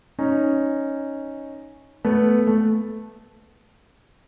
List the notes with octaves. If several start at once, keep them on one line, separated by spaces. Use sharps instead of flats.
C#4 D#4
A3 B3
A3